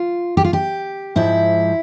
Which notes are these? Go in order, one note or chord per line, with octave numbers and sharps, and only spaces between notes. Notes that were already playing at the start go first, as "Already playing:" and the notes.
Already playing: F4
G4
F4
G4
G#2 F3 E4